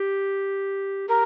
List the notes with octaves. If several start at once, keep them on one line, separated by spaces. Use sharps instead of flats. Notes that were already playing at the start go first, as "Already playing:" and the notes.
Already playing: G4
G4 A#4